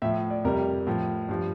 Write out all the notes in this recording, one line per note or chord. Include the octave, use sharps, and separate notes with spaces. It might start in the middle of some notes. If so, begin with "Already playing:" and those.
A2 F3 E5
D5
F2 C3 G3 A#4
A2 F3
G2 F3